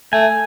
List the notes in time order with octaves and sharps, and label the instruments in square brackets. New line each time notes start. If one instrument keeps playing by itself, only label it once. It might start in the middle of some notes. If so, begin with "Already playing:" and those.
[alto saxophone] A3 [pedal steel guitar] G#5